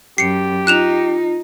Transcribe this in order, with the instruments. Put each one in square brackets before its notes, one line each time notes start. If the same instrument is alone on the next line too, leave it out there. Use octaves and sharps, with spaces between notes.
[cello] F#2 [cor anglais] G4 [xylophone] C7 C#7
[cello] D#4 [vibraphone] F4 [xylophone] F#6 E7 F7